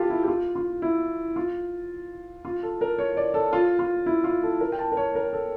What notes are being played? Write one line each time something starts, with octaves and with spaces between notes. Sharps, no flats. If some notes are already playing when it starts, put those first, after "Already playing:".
Already playing: F4 G4 A4
E4
G4
F4
F4
E4
F4
F4
A4
A#4
C#5
D5
A4
F4
F4
E4
F4
A4
A#4
G5
A5
A#4
C#5
A#4
A4